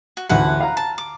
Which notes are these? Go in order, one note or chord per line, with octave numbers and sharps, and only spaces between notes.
F#4
A1 D2 E4 B4 F#5
F5 A#5
A5
D6